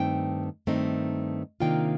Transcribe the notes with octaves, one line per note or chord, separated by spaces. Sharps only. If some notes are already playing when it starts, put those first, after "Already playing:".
Already playing: G2 D#3 A3 C4 D#4 G5
G2 D#3 A3 C4 D#4
C3 D#3 A#3 D4 F4 G5